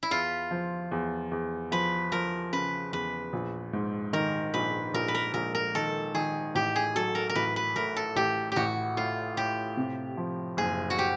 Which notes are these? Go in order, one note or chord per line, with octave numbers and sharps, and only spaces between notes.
E4
E2 F4
F3
E2
E2
F3 B4
F3 A#4
C#3 B4
E2 B4
A#1
G#2
D#3 A#4
A#1 B4
A#1 A#4
B4
A#4
A#1 A#4
A#4
D#3 A4
D#3 G#4
A1 G4
G#4
F#3 A4
A#4
A#4
A1 B4
B4
A2 A#4
A4
A1 G4
A1 F#4 G4
A2 F4
A2 G4
C3
F3
F#1 G#4
F#4
G4